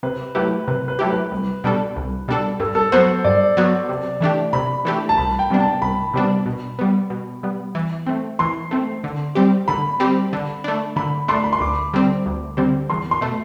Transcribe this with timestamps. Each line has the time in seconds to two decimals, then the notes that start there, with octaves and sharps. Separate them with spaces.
0.03 C3 B4
0.35 F#3 A3 E4 G4 B4
0.68 C3 B4
0.88 B4
0.99 F#3 A3 E4 G4
1.10 B4
1.32 C2
1.64 B2 G3 D4 A4
1.96 C2
2.28 B2 G3 D4 A4
2.60 G2 A4
2.75 A4
2.92 F#3 B3 F#4 C5
3.24 G2 D5
3.57 F#3 B3 F#4
3.89 C3
4.21 E3 A3 D4 G4
4.53 C3 B5
4.85 E3 A3 D4 G4
5.09 A5
5.18 C2 B5
5.39 G5
5.50 C3 G3 B3 D4
5.60 A5
5.82 C2 B5
6.14 C3 G3 B3 D4
6.46 B2
6.79 G3 B3
7.10 B2
7.43 G3 B3
7.75 E3
8.06 A3 C4
8.39 E3 C6
8.71 A3 C4
9.04 D3
9.35 G3 C4 G4
9.68 D3 B5
10.00 G3 C4 G4
10.33 D3
10.64 A3 D4
10.96 D3 B5
11.28 A3 D4 C6
11.44 B5
11.53 C6
11.60 D2 D6
11.94 D3 G3 C4
12.26 D2
12.57 D3 G3 C4
12.90 E2 C6
13.11 C6
13.21 B2 A3